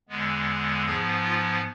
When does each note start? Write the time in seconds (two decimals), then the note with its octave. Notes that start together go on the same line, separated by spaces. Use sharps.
0.09 E2 D3 G#3 B3
0.84 G#2 F3 B3 G#4
1.23 F4